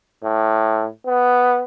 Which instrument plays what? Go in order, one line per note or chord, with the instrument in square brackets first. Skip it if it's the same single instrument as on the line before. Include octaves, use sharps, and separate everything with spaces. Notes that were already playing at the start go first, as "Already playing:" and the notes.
[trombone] A2
B3